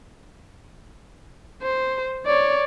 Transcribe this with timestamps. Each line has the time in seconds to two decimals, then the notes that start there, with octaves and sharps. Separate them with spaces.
1.63 C5
2.26 C#5 D5